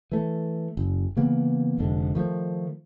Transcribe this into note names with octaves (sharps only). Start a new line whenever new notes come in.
E3 A3
F#1
C#3 E3 A#3 B3
F1 G#2 D3
D#3 F3 A3